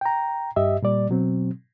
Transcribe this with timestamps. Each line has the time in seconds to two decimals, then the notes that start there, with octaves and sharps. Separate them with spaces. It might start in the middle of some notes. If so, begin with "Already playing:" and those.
0.01 G5 A#5
0.56 G2 G4 D#5 E5
0.82 A#2 G3 D5
1.09 B2 F#3 C4